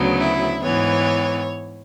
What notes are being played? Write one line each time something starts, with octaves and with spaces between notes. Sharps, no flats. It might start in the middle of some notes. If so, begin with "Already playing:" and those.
Already playing: D2 C#3 F#3 B3
E4
G#2 E3 B3 C#5